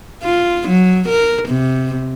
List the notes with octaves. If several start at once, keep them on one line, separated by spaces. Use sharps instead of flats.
F4
F#3
A#4
C3